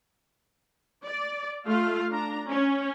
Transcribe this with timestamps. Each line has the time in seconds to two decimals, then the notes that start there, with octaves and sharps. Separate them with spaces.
1.04 D5
1.67 A3 F4 F5
2.10 D4 A#5
2.50 C#4